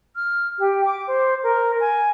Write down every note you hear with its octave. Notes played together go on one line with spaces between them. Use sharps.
F6
G4
D6
C5
A#4
G#5